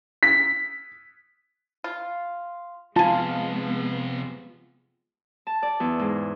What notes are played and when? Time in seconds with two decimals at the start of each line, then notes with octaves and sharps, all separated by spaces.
0.23 B6
1.84 F4
2.96 C3 F3 G#3 B3 F4 G#5 A5
5.47 A5
5.63 D5
5.80 E2
5.99 G#2